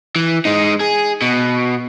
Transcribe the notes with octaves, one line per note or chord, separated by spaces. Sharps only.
E3
G#3 D#4
G#4
B2